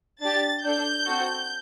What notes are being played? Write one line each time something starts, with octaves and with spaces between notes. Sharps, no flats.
D4 G4 A6
D4 A4 G6
C4 F#4 A4